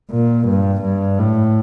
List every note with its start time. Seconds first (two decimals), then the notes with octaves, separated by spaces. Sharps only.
0.10 A#2
0.47 G2
0.82 G2
1.19 A2